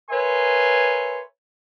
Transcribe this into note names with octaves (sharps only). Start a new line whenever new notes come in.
A#4 B4 C#5 E5 G#5 C6